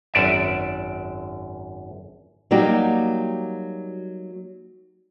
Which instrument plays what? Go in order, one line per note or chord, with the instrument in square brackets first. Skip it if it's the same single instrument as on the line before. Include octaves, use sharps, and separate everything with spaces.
[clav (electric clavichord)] G#1 F#2 D5 E5
[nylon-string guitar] F#3 G3 A#3 D#4 F#4 G4